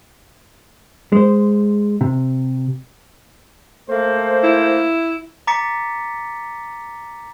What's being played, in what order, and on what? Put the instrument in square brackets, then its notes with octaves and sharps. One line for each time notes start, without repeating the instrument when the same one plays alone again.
[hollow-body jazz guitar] G#3 C5
C3
[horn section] A3 A#3 C5
[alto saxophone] E4
[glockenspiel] A#5 D6 A6 B6 C#7